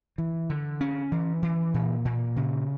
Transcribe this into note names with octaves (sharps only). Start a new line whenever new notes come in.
E3
D3
C#4
E3
E3
A#2
A#2
C#3